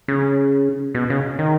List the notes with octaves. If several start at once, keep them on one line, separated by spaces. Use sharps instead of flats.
C#3
B2
C#3
D#3